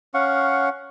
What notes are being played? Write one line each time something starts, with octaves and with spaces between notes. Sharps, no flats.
C#4 F5 F#5 C#6